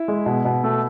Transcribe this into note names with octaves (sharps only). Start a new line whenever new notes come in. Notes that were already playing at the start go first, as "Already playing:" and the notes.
Already playing: E4
G#3
B2
B2
A3